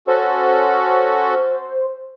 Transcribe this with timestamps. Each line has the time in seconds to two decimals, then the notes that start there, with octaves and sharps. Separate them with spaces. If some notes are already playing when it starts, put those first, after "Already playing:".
0.07 C#4 F#4 A4 C5